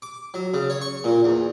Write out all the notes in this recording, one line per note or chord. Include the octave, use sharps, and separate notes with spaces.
D6
F#3
C#3
C#5
C#6
A#2
E2